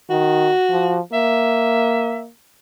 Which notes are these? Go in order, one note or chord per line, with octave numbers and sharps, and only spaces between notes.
D#3 F#4
F3
A#3 E5